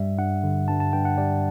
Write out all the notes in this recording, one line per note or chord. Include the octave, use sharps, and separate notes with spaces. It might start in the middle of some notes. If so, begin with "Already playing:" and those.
Already playing: G2 G3 E5
G2 F#5
D3
G2 A5
A5
G2 G5
F#5
G3 D5